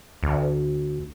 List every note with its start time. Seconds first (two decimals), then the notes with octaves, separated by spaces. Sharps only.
0.23 D2